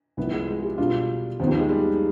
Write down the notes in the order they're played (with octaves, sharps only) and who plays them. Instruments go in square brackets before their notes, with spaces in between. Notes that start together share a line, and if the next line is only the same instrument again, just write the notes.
[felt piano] C2 C3 F3 [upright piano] B3
[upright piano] G#3
G#3
G3
[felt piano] B2 B3 D4 F4
[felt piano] D#2 D#3 B3 [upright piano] F3
[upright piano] G3
G#3
G3